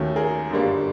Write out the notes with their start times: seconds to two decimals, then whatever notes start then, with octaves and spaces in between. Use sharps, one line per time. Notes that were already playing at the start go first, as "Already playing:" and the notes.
Already playing: D#2 D#3 F#3 A3 C#4
0.16 G#4 A#4
0.51 G1 F#2 D3 G3 A#3